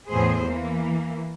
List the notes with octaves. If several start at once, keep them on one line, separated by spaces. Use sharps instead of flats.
E2 A2 G#4 C5
E3 A#3